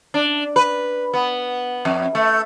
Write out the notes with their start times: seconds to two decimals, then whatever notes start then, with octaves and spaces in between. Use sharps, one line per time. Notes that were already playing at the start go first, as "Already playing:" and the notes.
0.14 D4
0.56 B4
1.14 B3
1.85 F2
2.15 A3